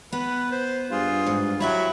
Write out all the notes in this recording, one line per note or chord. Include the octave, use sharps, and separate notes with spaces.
B3 B4
C5
G2 F4 G#4
G#2
F#3 E4 E5 G5 B5